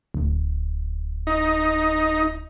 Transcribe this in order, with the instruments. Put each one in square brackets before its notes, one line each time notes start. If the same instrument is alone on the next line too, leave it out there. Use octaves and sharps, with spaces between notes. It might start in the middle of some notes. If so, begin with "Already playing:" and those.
[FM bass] D1
[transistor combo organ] D#4